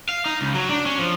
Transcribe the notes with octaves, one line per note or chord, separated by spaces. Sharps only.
F5
D#4
C#2
F#3
D4
C#4
F3